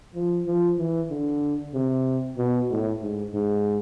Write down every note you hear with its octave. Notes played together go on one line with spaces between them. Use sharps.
F3
F3
E3
D3
C3
B2
A2
G#2
G#2